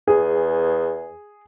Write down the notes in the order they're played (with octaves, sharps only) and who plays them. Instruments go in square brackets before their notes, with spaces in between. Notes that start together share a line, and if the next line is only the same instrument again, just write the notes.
[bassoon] E2 [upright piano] G#4